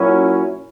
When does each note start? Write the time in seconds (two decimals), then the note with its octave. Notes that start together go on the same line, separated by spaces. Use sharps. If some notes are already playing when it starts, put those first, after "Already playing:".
Already playing: A#2 F#3 C#4 E4